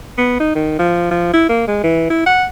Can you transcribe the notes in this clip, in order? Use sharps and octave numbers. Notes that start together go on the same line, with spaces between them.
B3
D#4
D#3
F3
F3
E4
A#3
G#3
E3
E4
F#5